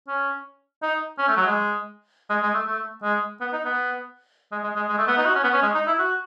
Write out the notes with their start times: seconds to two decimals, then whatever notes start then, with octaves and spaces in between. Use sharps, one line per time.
0.08 C#4
0.82 D#4
1.18 C#4
1.28 A3
1.37 F#3
1.47 G#3
2.30 G#3
2.43 G#3
2.54 A3
2.67 A3
3.03 G#3
3.41 B3
3.53 D#4
3.65 B3
4.52 G#3
4.63 G#3
4.76 G#3
4.89 G#3
4.98 A3
5.07 B3
5.17 D#4
5.25 F#4
5.35 C#4
5.43 B3
5.53 C#4
5.62 G#3
5.75 D#4
5.87 E4
5.99 F#4